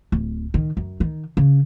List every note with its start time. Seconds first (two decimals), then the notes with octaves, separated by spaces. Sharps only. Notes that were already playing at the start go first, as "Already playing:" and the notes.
0.12 D1
0.54 D#3
0.77 F#2
1.00 D#3
1.37 C#3